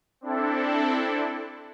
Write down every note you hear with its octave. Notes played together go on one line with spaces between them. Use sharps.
C4 D4 E4 A4